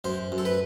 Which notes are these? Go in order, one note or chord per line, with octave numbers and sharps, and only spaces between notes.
F#2 C5
F#2
A4
B4